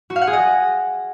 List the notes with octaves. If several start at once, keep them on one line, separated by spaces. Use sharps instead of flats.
F#4
F5
F#5
G#4
D#5